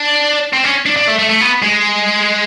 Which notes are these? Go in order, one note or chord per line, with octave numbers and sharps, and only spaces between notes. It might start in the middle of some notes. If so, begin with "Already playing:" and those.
Already playing: D4
C4
C#4
D4
D4
A3
A3
A3
B3
G#3